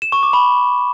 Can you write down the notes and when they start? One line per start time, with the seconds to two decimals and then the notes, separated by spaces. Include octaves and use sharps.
0.02 E7
0.12 C#6
0.23 D6
0.33 B5